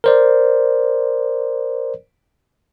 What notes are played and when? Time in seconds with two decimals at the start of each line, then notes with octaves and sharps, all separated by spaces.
0.04 A#4 C5 D5